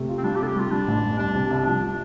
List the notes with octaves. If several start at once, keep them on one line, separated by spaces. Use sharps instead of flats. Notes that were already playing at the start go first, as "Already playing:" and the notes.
Already playing: C3 A3
F4
C4
G3 D4
G4
C3 A4
G4
G3 F4
G3 D4
A1
G2
C2 D4
C3
C2
F3 D4